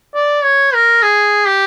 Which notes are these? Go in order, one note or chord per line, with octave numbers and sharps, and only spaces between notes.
D5
C#5
A#4
G#4
G4